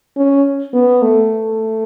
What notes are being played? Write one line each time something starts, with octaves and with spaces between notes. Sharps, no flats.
C#4
B3
A3